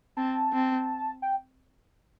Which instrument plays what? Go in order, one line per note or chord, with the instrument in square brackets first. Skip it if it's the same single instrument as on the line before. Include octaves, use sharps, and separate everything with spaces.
[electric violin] C4 [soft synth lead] A5
[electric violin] C4
[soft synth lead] G5